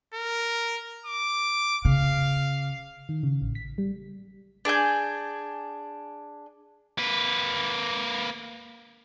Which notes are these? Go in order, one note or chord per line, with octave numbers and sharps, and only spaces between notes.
A#4
D6
C#3 F5
D#3
C#3
A1
B6
G3
D4 G#4 G#5 G6
A#3 B4